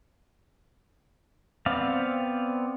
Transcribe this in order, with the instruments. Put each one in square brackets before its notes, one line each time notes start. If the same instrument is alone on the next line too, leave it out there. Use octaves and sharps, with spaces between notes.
[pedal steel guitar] B3 C4 D5 F5